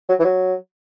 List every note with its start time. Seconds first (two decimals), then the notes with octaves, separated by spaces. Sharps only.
0.09 F#3
0.19 E3
0.25 F#3